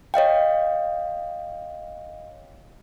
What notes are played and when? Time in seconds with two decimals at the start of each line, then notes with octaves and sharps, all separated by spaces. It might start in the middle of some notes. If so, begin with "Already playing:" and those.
0.14 C#5 D#5 F5 G5